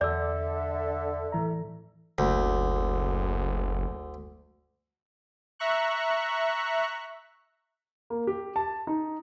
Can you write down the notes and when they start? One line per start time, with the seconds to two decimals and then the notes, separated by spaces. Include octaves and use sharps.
0.01 E2 D3 A4 D5 E5 E6
1.32 A2 E3 A#5
2.18 F#1 D2
5.59 E5 A#5 C#6 F#6
8.10 A#3
8.27 G4
8.56 A5
8.87 D#4